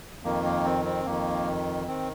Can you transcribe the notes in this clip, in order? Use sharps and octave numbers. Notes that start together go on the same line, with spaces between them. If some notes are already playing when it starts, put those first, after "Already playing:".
F2 D#3 A#3
A#3
C4
C4
F2 D#3 A#3
D#3 C4